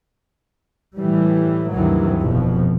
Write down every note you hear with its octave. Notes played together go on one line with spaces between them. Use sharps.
A2 E3 G3
D2 G2 C3 D#3 E3 F#3
F1 F2 B2 F3